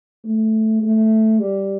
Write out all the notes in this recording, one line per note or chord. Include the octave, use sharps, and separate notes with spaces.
A3
A3
G3